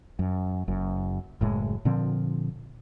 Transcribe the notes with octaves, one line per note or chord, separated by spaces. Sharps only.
F#2
F#1 F#2
F#1 A2 G#3
A#2 D3 F3 C4